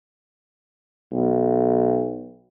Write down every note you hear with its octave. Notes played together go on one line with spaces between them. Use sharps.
B1